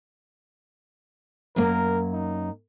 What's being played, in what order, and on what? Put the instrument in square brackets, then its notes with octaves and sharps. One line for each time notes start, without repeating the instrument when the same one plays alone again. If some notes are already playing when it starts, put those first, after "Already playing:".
[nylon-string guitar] F#2 A#3 [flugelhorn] A#4
[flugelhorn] D#4